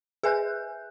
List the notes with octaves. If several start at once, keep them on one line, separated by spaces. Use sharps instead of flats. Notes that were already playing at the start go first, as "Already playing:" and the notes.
G#4 B4 E5 G#5 F#6 G6